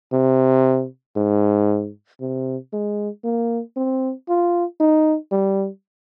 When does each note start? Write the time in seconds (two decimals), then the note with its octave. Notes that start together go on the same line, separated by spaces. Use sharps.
0.13 C3
1.16 G#2
2.20 C3
2.73 G#3
3.24 A#3
3.77 C4
4.28 F4
4.80 D#4
5.31 G3